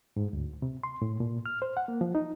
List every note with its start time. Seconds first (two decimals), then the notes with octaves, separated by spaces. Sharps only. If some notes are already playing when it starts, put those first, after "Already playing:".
0.16 G#2
0.33 D2
0.62 C3
0.84 C6
1.02 A2
1.20 A#2
1.46 F6
1.62 C5
1.77 F#5
1.88 A#3
2.01 F3
2.15 D#4